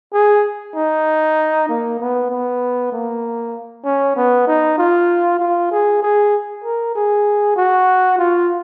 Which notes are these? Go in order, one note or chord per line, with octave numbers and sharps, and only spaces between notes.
G#4
D#4
A#3
B3
B3
A#3
C#4
B3
D#4
F4
F4
G#4
G#4
A#4
G#4
F#4
F4